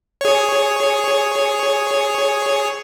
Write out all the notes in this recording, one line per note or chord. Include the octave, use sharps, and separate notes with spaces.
G#4 C#5